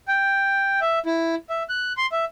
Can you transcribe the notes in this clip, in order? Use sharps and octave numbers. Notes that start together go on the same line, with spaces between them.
G5
E5
E4
E5
F#6
C6
E5